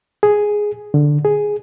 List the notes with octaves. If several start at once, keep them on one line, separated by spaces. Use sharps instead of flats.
G#4
D3
G#4